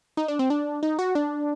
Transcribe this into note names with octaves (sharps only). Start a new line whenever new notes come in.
D#4
D4
C4
D4
D#4
F#4
D4